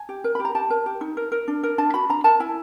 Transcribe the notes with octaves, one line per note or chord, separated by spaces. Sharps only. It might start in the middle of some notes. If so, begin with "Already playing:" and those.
Already playing: G#5
G4
A#4
B5
G4
A#5
G4 A5
A#4
G4
D#4
A#4
A#4
D4
A#4
D4 A5
F#4 B5
D4 A#5
A#4 A5
E4 G#5